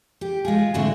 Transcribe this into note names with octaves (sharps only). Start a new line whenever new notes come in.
G4
G#3 F4 G#4
A2 D3 C4 D4 F#4